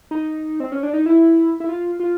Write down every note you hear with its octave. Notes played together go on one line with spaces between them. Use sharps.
D#4
C4
C#4
D4
D#4
E4
E4
F4
F4